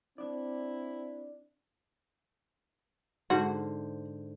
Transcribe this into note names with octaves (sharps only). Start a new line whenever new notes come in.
C4 D4 E4 D5
G#2 D3 F#4 C5